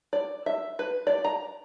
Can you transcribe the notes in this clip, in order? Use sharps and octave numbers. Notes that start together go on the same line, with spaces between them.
D5
E5
B4
D5
A#5